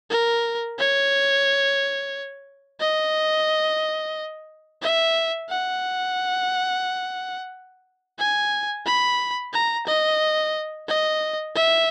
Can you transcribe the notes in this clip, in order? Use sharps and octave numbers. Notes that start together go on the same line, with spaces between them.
A#4
C#5
D#5
E5
F#5
G#5
B5
A#5
D#5
D#5
E5